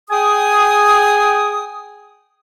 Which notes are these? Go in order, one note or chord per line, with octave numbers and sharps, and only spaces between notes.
G#4 G5 G#5 D#6